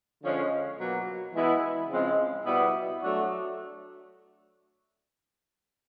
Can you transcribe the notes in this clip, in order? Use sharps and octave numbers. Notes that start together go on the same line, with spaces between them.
D3 F3 G#3 C#4
B2 F#3 A#3
E3 G#3 B3 E4
C#3 F3 G#3 C4
B2 G3 B3 E4
F#3 A3 D4 F#4